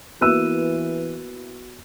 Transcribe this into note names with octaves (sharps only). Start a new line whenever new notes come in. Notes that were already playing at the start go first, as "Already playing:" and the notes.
E3 A#3 B3 E4 F#4 E6 F#6 D#7